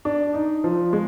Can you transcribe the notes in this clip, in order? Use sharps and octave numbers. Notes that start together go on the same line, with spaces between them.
D4
D#4
F3
G#3